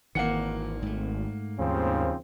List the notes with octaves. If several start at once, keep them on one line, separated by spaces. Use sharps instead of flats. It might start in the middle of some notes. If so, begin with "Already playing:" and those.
G#1 D#3 E3 A#3 F#5 C#7
G#2 A3
D#2 C#3 F3 C4